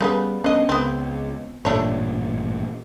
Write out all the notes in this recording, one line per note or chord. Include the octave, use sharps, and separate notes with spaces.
C#3 G3 A#3 B3
C2 B3 C#4 D4 D#5
C#2 B3 C4
A1 G2 A#2 A3 D4 C#5